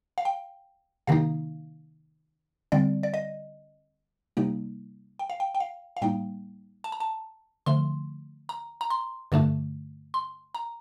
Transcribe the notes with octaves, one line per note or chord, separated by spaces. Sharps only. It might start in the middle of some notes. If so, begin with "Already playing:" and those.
F5
G5
C3 D#3 A#3 D#4 F5
D3 G3 C4 D5
D5
D#5
C3 G3 A#3 D#4
G5
F5
G5
G5
F5
F5
A2 G3 A#3 D#4 G5
A5
A#5
A5
D3 F3 A3 C6
A#5
A#5
C6
G2 D3 A3 D4
C6
A#5